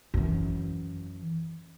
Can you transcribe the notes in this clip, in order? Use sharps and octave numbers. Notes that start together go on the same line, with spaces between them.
F#2 E3